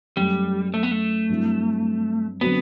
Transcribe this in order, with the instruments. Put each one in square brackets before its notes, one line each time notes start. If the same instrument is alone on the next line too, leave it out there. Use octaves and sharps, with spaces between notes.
[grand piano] F#2 F#3 A3 [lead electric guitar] G3
[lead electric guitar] A3
B3
A3
[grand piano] G2 F#3 C4 E4
[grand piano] D3 F#3 C4 F#4 [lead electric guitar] B3